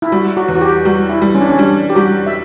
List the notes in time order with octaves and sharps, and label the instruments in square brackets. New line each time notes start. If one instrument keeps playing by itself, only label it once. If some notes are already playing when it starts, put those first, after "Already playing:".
[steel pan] E4
[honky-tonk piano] G3 [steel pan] F#4
[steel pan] F#4
[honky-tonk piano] E2
[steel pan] F#4
G4
[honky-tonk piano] G3 [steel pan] F#4
[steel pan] E4
[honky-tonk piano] G3
[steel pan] C#4
D4
C#4
[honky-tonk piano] G3 [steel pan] D4
[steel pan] G4
[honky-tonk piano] G3 [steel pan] F#4
[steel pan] E5